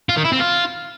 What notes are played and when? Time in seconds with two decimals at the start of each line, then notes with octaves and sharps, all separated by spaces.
0.09 F4
0.17 D#3
0.25 E4
0.33 C4
0.40 F4